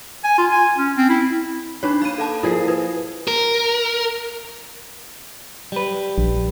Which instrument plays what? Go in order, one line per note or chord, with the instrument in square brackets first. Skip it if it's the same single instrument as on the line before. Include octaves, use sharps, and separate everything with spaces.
[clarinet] G#5
F4
G#5
C#4
C4
E4
[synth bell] D4 D#4 C#5 [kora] B4
[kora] A#3 [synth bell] B5 D#7
[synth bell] A4 F5 A5
[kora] F3 G#4 [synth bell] E4 A#4 C7
[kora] G#4 [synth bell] B4
[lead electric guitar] A#4
[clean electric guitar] G3 B4
[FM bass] A#1